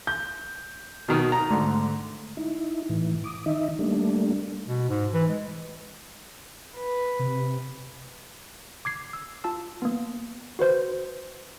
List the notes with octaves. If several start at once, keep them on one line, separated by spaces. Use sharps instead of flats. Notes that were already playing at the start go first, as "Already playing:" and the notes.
G6
B2 D#3
A#5
G#2 D3 A3
D#4 E4
A2 E3
D6 D#6
D#3 D#4 D#5 E5
G3 A3 A#3 D4
B2
G#2
E3
G#3
B4
C3
D6 G#6 C7
E6
F4 A5 E6
A#3 B3
F#4 B4 C5 G6